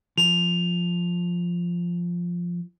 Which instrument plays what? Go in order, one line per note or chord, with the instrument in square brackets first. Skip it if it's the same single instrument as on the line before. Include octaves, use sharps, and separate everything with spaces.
[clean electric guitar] F3 [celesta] F7